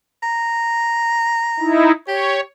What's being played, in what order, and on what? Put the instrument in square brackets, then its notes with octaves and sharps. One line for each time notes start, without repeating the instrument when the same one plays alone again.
[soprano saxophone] A#5
[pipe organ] D#4 E4
[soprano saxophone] G4 [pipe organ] C#5